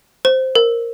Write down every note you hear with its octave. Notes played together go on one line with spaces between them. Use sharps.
C5
A#4